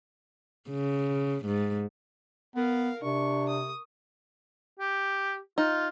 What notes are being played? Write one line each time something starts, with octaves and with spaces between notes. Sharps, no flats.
C#3
G#2
B3 A#4 F5
C3 D4 C#6
D#6
G4
D#4 F4